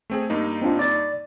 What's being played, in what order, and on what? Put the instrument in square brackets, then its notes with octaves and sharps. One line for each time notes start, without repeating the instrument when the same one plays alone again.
[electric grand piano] A3 C4 G#4
G2 A#3 D#4
[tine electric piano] C4 D4 F4
D5 A6